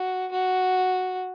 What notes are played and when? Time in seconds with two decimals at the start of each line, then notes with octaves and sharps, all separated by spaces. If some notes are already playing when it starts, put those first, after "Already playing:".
Already playing: F#4
0.31 F#4